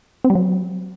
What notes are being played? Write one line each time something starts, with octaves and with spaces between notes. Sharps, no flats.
C4
G3
F#3